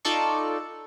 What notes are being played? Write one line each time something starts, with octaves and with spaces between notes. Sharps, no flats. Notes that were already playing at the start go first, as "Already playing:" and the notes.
D#4 F4 A4 D5 C#6